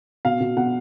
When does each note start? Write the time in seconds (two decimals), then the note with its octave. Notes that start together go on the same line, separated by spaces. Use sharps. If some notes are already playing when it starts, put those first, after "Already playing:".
0.25 B2 F5
0.40 B2
0.57 B2 F#5